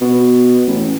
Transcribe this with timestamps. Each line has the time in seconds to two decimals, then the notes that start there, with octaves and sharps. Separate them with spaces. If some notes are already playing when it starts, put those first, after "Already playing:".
0.01 B2
0.67 A1